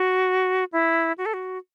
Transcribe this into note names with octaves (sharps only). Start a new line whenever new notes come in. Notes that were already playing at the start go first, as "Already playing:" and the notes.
Already playing: F#4
E4
F#4
A4
F#4